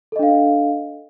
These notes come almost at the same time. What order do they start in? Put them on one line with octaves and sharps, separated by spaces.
A4 D#5 D4 F5